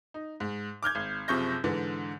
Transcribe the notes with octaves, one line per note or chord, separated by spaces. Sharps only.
D#4
G#2
D6 F6 G6 G#6
G#1
F#1 C3 F3 C#6 G6 A#6
G#2 D3 E3